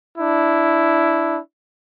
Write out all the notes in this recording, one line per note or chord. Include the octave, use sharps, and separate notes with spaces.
D4 E4